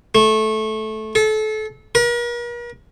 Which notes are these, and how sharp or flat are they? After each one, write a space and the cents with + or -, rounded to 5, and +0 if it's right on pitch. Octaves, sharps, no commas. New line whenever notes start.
A3 -15
A4 -30
A#4 +45